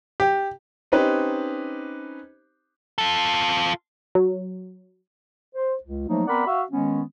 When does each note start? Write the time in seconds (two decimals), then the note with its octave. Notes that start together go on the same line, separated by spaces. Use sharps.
0.20 G4
0.92 C4 C#4 D#4 G4 B4 C5
2.98 F4 A4
4.15 F#3
5.55 C5
5.84 C#2
6.07 F3 F#3 A3 A#3 D#4
6.27 B3 C4 A#4 D5 F#5 B5
6.46 F#4 E5 F5
6.71 D#3 G#3 B3 C#4